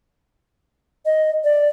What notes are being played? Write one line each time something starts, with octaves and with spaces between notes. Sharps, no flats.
D#5
D5